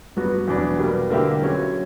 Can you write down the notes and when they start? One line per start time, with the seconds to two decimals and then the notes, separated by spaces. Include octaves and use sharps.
0.16 G2 F#3 B3 F#4
0.48 E2 B2 F#3 B3 D4
0.79 B2 G3 A#3
1.10 D3 A#3 E4 G4
1.42 F#3 C#4 F#4